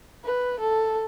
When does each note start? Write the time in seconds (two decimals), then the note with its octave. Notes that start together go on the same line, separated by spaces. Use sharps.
0.24 B4
0.60 A4